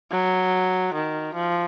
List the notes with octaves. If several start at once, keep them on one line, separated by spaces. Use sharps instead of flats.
F#3
D#3
F3